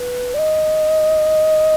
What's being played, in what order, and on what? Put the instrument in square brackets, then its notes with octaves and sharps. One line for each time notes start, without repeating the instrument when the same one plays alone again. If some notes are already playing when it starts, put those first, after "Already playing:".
Already playing: [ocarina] B4
D5
D#5